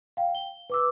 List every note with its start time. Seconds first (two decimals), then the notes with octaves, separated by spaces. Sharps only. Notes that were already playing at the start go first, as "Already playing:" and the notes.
0.17 F5 G5
0.35 G7
0.70 B4 D6 E6